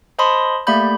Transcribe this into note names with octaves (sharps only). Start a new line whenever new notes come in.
C5 D#5 A5 B5 C6 D#6
A3 A#3 G4 D5 B5 G6